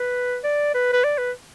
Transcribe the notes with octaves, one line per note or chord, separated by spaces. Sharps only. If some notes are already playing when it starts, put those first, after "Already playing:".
Already playing: B4
D5
B4
B4
D5
B4